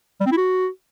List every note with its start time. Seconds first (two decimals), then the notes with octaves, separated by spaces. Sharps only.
0.21 G3
0.26 C4
0.32 E4
0.38 F#4